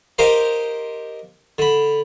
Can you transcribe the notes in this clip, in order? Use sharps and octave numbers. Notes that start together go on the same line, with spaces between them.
G4 A#4 C5 D#5 F5
D3 B5